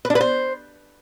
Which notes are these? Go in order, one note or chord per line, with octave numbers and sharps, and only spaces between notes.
B4
D4
B4
C5